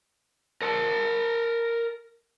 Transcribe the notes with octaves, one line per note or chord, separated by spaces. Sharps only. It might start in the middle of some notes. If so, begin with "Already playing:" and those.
A#4 A5